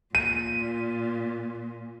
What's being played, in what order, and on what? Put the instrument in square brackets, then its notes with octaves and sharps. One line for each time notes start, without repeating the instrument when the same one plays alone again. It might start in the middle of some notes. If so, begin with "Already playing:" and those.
[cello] A#2 [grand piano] D#7